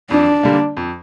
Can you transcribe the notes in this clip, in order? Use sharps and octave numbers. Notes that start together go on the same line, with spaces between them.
F2 D4
D3 G3 A#3
F2